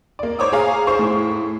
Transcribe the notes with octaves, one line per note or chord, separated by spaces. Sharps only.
A#3 D5
C5 C#5 D6 D#6
G#4 C#5 F5 A#5
G#4 C5 C#6
A2